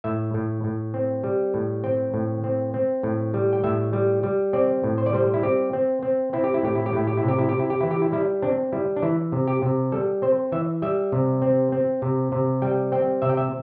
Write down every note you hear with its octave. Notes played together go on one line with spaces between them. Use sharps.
A2 E5
A2
A2
C4
G3
A2
C4 G5
A2
C4
C4
A2
G3
G5
A2 E5
G3
G3
C4 D5
A2
C5
D5
G3 C5
E4
C4 G4
C4
C4
C4 E4
G4
E4
A2 G4
E4
G4
A2 E4
G4
E4
C3
G4
E4
C3 G4
E4
G4
E3 E4
G4
E4
G3 E4
C4 D4
G3 E4
D4
E3 E4
C3
G4
C3
G3 A4
C4 C5
E3 E5
G3 E5
C3
C4
C4
C3
C3
G3 G5
C4 G5
C3 E5
G5
E5